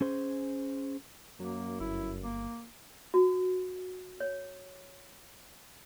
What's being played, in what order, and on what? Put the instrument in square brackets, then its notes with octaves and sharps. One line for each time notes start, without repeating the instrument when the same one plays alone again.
[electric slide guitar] C#4 G#4 C5
[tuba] F#2 [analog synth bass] F#3 [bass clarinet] A#3
[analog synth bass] G1 [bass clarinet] E4
[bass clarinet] A#3
[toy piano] F#4
C#5